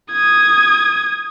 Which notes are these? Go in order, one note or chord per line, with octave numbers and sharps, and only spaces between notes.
D#6 G#6